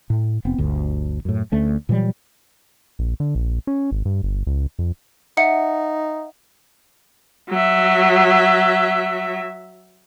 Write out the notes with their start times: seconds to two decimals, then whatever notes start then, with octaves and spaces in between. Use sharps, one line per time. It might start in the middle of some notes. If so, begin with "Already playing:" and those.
0.10 A2
0.45 F1 B3 C4
0.58 G1 D2
1.25 F#2 A2
1.52 D2 A3 C#4
1.89 A#2 E3 F#3 G3
2.99 A#1
3.20 D3
3.35 A#1
3.67 C#4
3.92 G#1
4.05 G2
4.23 G1
4.47 C#2
4.79 F2
5.37 D#4 E5 F#5 C#7
7.49 F#3 E5